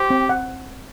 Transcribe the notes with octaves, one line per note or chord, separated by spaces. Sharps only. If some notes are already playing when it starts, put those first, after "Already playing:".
Already playing: G4 C5
C4
F#5